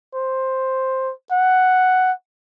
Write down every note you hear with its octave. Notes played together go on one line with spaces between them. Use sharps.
C5
F#5